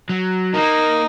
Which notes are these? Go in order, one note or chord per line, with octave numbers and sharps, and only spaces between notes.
F#3
A#3 D#4